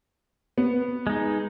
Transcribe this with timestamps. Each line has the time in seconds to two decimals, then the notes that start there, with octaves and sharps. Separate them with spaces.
0.58 B3
1.07 G#3 D#4